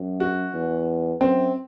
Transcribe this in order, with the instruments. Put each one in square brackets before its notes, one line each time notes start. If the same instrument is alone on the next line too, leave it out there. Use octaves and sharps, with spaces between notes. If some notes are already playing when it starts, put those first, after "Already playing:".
Already playing: [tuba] F#2
[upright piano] F#4
[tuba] E2
[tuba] F#2 [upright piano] C4